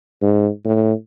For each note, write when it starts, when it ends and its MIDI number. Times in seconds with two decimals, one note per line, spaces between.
0.22 0.49 44
0.65 0.93 45